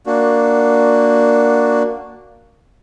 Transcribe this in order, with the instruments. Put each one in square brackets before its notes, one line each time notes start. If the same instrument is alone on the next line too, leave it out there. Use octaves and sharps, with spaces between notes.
[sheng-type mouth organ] A#3 D4 F#4